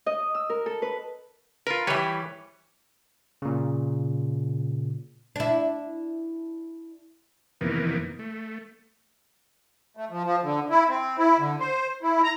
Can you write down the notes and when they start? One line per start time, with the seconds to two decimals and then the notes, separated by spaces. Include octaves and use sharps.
0.06 D#5
0.35 E6
0.50 A#4
0.66 A4
0.82 B4
1.67 F4 A#4 B4
1.87 E3 G3 G4 B4 C#5
3.42 A#2 C#3
5.36 D4 E4
7.61 F2 C3 D#3 E3 A#3 B3
8.19 A3
9.97 A3
10.10 F3
10.24 F3
10.43 D3
10.70 E4
10.88 C4
11.18 E4
11.39 D3
11.60 C5
12.03 E4
12.23 A#5